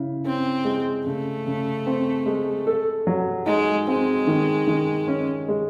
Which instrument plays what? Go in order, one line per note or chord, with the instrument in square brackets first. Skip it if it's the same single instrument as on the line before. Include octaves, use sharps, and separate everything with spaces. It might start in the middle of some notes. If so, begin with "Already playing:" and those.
Already playing: [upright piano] C#3 E4
[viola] C4 [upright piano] C#4
[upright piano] G#3
[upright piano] C#3 [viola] A3
[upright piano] C#3
C4
G#3
A4
F#3
[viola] G#3 [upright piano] D#4
[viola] G#3 [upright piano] C4
[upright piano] D#3
D#3
C#4
G#3